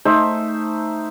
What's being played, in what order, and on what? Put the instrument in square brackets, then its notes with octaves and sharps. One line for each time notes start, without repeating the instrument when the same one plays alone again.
[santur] A3 D#4 C5 E5